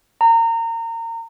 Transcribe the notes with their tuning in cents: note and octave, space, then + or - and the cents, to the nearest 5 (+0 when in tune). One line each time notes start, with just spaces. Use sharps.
A#5 -30